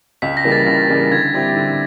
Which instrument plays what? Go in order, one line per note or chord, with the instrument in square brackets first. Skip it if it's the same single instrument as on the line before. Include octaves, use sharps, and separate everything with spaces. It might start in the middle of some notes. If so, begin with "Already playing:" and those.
[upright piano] C#2 [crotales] B6
[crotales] A#6
[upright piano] C#3 E3 G3 A#3
[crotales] A6
[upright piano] C#2
C#3 E3 G3 A#3
[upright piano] D3 [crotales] G#6
[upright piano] G3 C4 E4 G4
D3